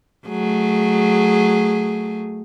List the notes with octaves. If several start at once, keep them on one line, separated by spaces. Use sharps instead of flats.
F#3 A3 G#4